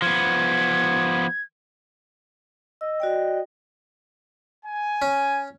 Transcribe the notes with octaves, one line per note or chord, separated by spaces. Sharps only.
F3 B3 G#6
D#5 E6
F#4 D5 G5
G#5
C#4